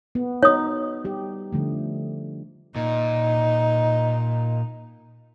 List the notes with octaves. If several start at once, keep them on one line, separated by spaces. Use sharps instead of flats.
B3
D#4 F#4 C#5 D#6
G3 G4
D3 F3 A3
A#2 D#4